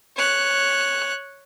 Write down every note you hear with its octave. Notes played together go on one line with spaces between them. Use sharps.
C#5 F#6